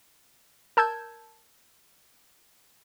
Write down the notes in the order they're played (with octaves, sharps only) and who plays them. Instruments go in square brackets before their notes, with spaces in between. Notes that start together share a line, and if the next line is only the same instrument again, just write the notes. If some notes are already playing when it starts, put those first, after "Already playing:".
[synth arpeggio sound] A#4 A5 E6 G6 G#6